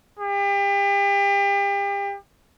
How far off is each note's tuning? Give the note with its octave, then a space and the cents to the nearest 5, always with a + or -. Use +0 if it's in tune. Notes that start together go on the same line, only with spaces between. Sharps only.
G4 +35